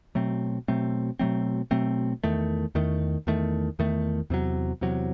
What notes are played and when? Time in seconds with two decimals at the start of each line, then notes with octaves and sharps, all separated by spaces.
0.15 B2 F#3 A3 C4
0.68 B2 F#3 A3 C4
1.19 B2 F#3 A3 C4
1.71 B2 F#3 A3 C4
2.24 E2 D#3 A3
2.75 E2 D#3 A3
3.27 E2 D#3 A3
3.79 E2 D#3 A3
4.30 E2 C3 F#3
4.81 E2 C3 F#3